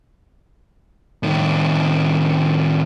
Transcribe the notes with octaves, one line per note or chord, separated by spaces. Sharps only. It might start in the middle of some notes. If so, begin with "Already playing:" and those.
A2 D#3